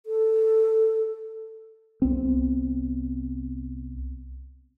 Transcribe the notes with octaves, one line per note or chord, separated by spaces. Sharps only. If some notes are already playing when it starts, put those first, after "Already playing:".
A4
C2 B3 C4